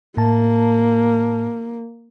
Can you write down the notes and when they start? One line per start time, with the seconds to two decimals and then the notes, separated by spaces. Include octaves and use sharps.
0.17 A2 A#3 A5